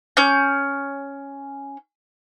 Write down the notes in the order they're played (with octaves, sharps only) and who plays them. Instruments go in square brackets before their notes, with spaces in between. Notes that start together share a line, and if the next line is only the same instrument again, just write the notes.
[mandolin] C#4 G6